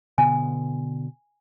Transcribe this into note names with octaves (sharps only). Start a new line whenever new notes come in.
B2 D3 B3 G#5